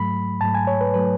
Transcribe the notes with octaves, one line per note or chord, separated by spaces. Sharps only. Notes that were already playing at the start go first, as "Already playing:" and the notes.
Already playing: G#2 F#3 A3 B5
G#2 F#3 A3 A5
G#5
C#5
B4
F#3 A3 B4